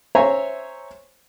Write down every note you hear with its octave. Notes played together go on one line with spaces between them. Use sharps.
C5 C#5 E5 G#5 A#5